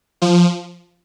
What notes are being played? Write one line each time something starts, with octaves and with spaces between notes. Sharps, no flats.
F3